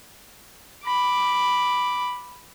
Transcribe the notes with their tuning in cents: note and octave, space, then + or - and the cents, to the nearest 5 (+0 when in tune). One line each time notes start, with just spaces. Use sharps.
B5 +0 D6 +0